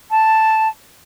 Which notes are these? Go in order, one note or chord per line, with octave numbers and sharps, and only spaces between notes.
A5